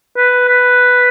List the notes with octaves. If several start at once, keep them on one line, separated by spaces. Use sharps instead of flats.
B4
B4